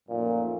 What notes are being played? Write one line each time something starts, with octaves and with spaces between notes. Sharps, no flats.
F#2 A#2 F3 A3 D#4 A#4